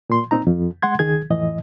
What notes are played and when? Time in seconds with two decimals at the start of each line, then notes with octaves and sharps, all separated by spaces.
0.10 A#2 C6
0.31 A#2 C4 D#4 A#5
0.47 F2
0.82 G#3 F#5 C6 G#6
0.99 C#2 D#3 G#4 G#6
1.30 F2 A2 E3 D#5